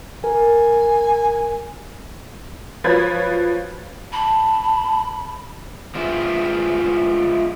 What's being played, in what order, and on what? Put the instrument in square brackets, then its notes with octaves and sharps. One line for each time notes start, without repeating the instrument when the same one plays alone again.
[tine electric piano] A#4 [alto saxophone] G#5
[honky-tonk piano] F3 F#3 B4 C#5 B5 G#6
[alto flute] A5 [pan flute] B5
[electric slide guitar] F3 G#3 B3 E4